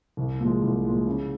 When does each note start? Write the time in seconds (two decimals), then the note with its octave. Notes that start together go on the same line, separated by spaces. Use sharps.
0.17 C2
0.40 A#2 F3 G#3
0.62 C2
0.84 A#2 F3 G#3
1.07 C#3